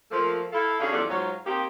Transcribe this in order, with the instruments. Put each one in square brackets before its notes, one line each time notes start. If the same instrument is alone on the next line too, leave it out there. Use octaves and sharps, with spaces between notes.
[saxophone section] F3 A3 A#3
E4 A4 F5
D3 C#4 D#4 F#4 G#4 F5
E2 F3 G3 E4 A4 D5
G#2 F#3 F4 C#5
A#3 C4 D#4 G4